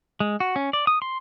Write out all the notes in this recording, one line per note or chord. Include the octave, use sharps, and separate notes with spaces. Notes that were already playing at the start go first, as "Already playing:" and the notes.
G#3
F#4
C#4
D5
D#6
C6